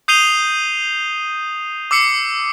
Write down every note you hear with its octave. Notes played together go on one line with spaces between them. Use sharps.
D#6 G6 C7 D#7 F7 G7
D6 E6 C7 C#7